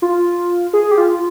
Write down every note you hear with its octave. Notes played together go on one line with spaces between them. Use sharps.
F4
G#4
G4
F4